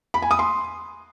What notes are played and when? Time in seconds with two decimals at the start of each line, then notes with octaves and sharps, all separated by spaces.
0.14 B5
0.22 G#5
0.31 D#6
0.39 C6